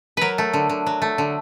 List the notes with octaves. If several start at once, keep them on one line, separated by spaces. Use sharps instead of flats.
F#3 A#4 B4
A3
D3
D3
F#3
A3
D3